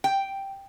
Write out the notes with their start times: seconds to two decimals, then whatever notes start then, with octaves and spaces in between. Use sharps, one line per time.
0.04 G5